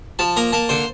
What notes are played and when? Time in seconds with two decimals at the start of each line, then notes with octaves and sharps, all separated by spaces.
0.19 F3 A5
0.36 A#3 A#5
0.53 A#3 A5
0.69 D3 C5